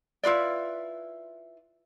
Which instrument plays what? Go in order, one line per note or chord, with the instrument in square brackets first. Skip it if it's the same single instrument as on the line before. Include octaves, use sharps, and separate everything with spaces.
[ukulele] E4 F4 B4 D5